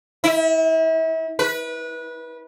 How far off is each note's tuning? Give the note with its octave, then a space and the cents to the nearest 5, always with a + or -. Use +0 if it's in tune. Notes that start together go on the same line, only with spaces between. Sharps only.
E4 -35
B4 -25